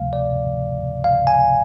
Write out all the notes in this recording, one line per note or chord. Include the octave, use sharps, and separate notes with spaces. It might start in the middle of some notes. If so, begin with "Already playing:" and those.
Already playing: D2 C3 F3 A3 F5
D5
F5
G#5